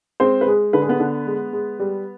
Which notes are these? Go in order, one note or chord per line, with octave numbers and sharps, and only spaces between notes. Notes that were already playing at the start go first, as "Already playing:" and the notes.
G#3 C4 C5
B4
G#3 G#4
D3 B4
G#4
B3 B4
D3
G#3
G#3
G3